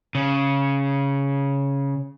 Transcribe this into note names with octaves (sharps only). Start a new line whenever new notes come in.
C#3